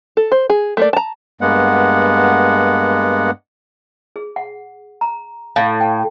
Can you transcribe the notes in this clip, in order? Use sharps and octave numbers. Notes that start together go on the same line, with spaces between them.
A4
C5
G#4
A3 A#3 D5
A5 A#5
G2 G#3 A#3 B3 F#5
G#4
F#5
A#5
A2 F5
G5